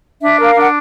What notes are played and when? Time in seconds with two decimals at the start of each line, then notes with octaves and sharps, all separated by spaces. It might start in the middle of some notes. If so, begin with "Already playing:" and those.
0.21 D4 E5
0.39 A#4 F5
0.55 D4 F#5